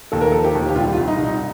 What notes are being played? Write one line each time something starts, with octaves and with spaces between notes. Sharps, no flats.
D#2 A4
A#4
F3 A4
G4
D#2
G4
C2 F4
F4
C2
D#4
C2
D#4